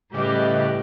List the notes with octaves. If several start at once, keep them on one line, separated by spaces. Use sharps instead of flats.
A2 C#3 G3 G4 B4 D#5 E5